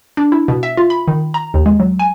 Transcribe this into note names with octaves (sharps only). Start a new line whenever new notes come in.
D4
E4
B2
E5
F4
B5
D#3
A#5
D#2
G#3
F#3
G#5